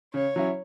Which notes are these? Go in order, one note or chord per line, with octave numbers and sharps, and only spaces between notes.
C#3 C#5
F#3 C#4 E4